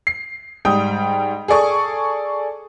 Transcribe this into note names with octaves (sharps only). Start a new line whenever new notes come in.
C7
G#2 G3 G5 D#6
G#4 A4 D5 C#6 D#6